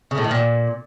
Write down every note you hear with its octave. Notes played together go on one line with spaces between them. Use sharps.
C#3
A2
D#3
A#2